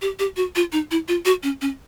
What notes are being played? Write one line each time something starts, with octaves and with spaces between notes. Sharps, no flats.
G4
G4
F#4
F4
D#4
E4
F4
F#4
C#4
C#4